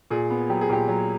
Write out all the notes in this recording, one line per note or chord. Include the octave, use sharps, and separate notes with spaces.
A#2 G#4
B3
F#3 G4
G#4
A#2 G4
F#3